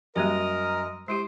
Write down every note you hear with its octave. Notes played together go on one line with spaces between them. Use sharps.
F#2 G3 A#3 G4 A#4 D#5
G#3 E4 G4 C5